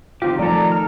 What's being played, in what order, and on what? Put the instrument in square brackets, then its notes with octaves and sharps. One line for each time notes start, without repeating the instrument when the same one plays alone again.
[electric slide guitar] D#3 C4 G4 [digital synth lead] F4
[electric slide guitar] D#3 A4 [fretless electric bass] F3 A3 [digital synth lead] D5 [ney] A#5
[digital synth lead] F6